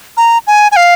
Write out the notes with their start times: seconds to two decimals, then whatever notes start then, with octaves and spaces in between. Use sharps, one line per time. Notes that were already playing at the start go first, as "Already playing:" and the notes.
0.17 A#5
0.47 G#5
0.72 G#5
0.76 F5